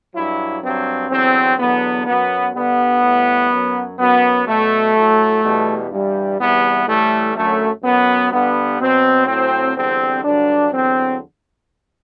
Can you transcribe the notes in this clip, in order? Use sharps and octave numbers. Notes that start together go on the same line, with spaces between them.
G2 F#3 E4
G2 F#3 C4
E2 D3 F#3 C4
E2 D3 F#3 B3
F#2 F#3 B3
G2 D3 G3 B3
A2 E3 G3
F#2 F#3
F#2 F#3 B3
B2 F#3 A3
A2 F#3
E2 B2 G3
G2 E3 G3
E2 C3 E3 G3 B3
A2 E3 G3 A3
F#2 D3 F#3 A3
F#2 F#3 B3
G2 D3 G3 B3
B2 F#3 C4
A2 F#3 C4
E2 D3 G3 C4
G2 D3 F#3 D4
E2 D3 F#3 C4